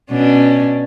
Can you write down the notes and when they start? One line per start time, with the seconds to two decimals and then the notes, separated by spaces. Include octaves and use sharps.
0.11 B2 C#4 D4